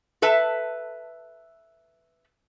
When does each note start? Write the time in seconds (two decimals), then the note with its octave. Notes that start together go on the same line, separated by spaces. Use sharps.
0.22 A4 B4 E5 A5